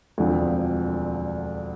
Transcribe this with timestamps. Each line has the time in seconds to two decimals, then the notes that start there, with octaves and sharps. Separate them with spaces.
0.18 E1 D2 D3 F3 C4